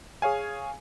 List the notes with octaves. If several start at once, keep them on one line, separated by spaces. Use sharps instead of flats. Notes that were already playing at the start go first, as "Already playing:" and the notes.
G#4 C#5 F5 G#5